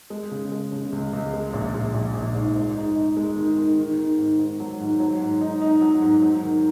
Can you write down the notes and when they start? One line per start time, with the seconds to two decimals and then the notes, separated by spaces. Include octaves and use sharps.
0.10 G#3
0.31 C#3
0.52 G#3
0.72 C#3
0.92 C#2
1.13 C#2
1.33 G#3
1.53 A#1
1.74 A#1
1.94 A#1
2.15 A#1
2.35 G#2
2.56 G#3
2.75 D#4
2.96 D#4
3.17 G#3
3.37 D#3
3.57 D#3
3.78 D#3
3.98 D#3
4.18 G#2
4.39 G#2
4.60 F#3
4.80 G#2
5.00 F#3
5.20 G#2
5.41 D#4
5.62 D#4
5.81 F#3
6.02 G#2
6.23 F#3
6.43 D#3